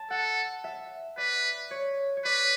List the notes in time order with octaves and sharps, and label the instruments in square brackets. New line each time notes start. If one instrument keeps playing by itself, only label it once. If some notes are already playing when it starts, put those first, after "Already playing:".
Already playing: [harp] A5
[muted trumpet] A4 [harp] F#5
[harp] E5
[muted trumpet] B4 [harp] D5
[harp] C#5
C#5
[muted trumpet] B4 [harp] D5